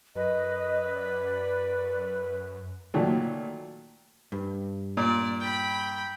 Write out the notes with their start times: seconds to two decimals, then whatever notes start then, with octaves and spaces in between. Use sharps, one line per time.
0.15 F#2 B4 D#5
0.94 D5
2.94 A#2 D#3 F#3 A3
4.32 G2
4.97 A#2 D5
5.40 G5 B5